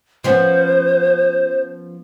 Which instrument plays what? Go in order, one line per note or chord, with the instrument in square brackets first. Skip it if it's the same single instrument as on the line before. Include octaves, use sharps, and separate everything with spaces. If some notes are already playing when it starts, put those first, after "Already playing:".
[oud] F3 B3 C#4 [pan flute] C5